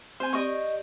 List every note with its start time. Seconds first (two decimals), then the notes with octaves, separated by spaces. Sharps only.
0.20 C4 C5 G#5
0.33 G4 D5 D#5 C#6